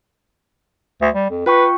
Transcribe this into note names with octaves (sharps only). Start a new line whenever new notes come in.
D2
G3
F2
F4 B4 G5 C#6